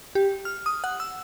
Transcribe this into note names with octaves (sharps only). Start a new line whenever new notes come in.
G4
F6
D#6
F#5
E6